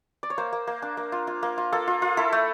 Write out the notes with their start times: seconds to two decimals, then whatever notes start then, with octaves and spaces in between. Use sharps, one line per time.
0.23 D5
0.30 C#5
0.38 A#3 C5
0.53 A#3
0.67 A#3
0.82 D4
0.97 A#3
1.12 F4
1.27 F4
1.43 A#3
1.58 F4
1.73 A#3 A4
1.87 F4
2.02 F4
2.17 E4 A4
2.32 A3